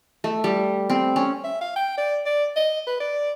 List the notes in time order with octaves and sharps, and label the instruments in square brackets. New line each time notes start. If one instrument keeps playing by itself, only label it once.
[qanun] A3
G3
C4
C#4
[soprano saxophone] E5
F5
G5
D5
D5
D#5
B4
D5